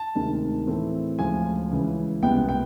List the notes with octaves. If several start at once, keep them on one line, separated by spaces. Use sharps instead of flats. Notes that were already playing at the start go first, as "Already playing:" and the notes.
Already playing: A5
D2 C3 D#3 G#3
A2 E3 A3 C4
D2 C#3 F3 G#3 G#5
C#2 C#3 E3
C2 B2 G#3 B3 G5
G5